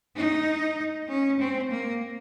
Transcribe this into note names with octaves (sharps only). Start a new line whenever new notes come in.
D#4
C#4
C4
A#3